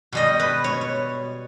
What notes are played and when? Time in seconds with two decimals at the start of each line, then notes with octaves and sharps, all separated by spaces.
0.12 B2 G3 D#5
0.40 B4
0.64 C#5
0.81 C#5